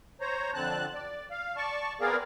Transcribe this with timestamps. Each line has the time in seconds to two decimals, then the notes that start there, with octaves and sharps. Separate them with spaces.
0.21 C5 C#5 A#5
0.54 F2 D3 C4 A5 F#6
0.94 D5
1.31 F5
1.57 D5 A5 C#6
2.01 B3 C4 G#4 A#4 D5 F5